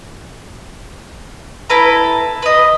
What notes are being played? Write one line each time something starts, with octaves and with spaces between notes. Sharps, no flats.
E4 A4 B4 A#5
B4 D#5